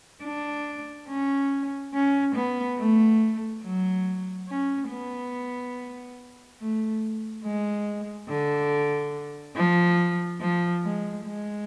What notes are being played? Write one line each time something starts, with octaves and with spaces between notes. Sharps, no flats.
D4
C#4
C#4
B3
A3
F#3
C#4
B3
A3
G#3
D3
F3
F3
G#3
G#3